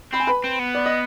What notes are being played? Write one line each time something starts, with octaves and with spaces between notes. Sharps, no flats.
C4 B5
G#5
B4 B5
C4
B3
D5
D#5